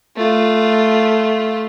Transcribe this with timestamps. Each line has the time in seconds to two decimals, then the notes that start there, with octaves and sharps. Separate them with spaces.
0.16 A3 F4